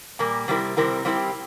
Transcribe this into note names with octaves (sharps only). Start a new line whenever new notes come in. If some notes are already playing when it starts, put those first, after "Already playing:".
A#2 G3 A#3
C3 G3 C4 E4 A#4
C3 G3 C4 E4 A#4
G3 C4 E4 G4 C5